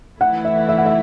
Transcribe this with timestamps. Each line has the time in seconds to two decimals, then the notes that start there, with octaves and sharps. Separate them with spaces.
0.21 E3 A3 E4 F#5
0.45 E5
0.69 E5
0.78 F#5
0.86 E5